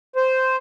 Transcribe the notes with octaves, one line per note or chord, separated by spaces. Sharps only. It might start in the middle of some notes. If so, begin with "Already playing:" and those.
C5